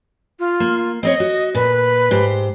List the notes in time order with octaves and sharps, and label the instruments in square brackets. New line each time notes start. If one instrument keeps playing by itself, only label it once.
[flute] F4
[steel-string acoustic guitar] A#3
[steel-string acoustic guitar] C4 B4 C#5 [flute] D#5
[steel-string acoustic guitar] F#4
[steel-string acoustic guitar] A#2 [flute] B4
[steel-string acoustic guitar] G#2 G4 C5